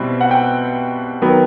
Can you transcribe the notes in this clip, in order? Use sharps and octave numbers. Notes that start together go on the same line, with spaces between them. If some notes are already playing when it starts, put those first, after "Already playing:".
Already playing: B2 G3 C4 E4
F#5
G5
D#3 F#3 B3